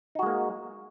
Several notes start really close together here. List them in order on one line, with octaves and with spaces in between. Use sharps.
D#4 F#4 G#3 A#3